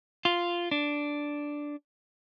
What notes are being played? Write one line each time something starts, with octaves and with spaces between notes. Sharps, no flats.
F4
D4